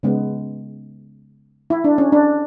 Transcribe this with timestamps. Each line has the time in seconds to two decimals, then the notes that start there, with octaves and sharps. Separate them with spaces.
0.03 C#3 G#3 B3
1.70 E4
1.84 D4
1.98 C#4
2.12 D4